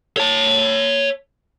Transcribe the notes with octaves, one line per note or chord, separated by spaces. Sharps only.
C#5 A5